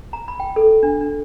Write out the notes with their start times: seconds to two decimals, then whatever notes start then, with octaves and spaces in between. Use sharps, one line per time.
0.13 A#5
0.28 B5
0.40 G5
0.56 A4
0.83 D4
1.01 D4